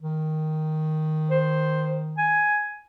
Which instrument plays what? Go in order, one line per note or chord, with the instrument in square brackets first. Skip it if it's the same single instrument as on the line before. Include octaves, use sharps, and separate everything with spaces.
[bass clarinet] D#3
[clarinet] C5
G#5